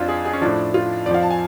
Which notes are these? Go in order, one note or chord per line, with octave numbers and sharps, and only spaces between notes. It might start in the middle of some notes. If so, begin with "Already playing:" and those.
Already playing: F2 F3 D4 F4
G#4
G#4
C#4
A2 F3 D4
F4
F2 F3 D5 F5
A5
G#5